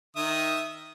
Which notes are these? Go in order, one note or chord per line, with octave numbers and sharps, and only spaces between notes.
D#3 E5 D#6